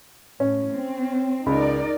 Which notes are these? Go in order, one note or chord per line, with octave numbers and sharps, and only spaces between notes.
A2 C#4
C4
C#2 D#4 A#4 D5 B5